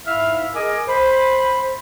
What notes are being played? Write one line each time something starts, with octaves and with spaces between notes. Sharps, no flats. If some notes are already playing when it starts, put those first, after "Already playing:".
G#2 E4 E5 F5 F6
G#4 A#4 D#5 G#5 D6 D#6
C5 B5